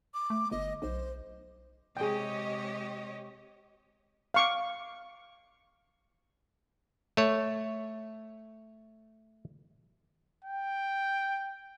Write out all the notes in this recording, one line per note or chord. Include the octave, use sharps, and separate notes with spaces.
D6
A3
G1 D#5
B1 C5
C3 G#3 G4 G#4 C#5 D#5 G5
F5 C#6 D6
A3 C#5
G5